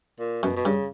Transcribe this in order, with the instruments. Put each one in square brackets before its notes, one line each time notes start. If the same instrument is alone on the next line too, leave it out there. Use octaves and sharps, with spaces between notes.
[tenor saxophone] A#2
[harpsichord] F#2 [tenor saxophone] B2
[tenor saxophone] B2
[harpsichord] G2 [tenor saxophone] C#3